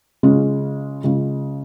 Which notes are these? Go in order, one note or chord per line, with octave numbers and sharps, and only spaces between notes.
C#3 G#3 C#4 F4
C#3 G#3 C#4 F4